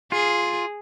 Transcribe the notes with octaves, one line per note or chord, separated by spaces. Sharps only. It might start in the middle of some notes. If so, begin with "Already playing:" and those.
F4 G#4